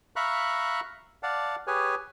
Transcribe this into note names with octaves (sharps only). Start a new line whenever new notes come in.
E5 F5 A#5 B5 C#6 F#6
D5 F5 F#5 A5
G4 G#4 B4 C#5 G#5